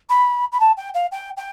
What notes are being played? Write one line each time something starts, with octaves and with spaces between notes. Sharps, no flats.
B5
B5
A5
G5
F5
G5
G5